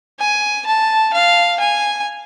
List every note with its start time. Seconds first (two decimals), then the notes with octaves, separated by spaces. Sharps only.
0.20 G#5
0.67 A5
1.14 F5
1.60 G#5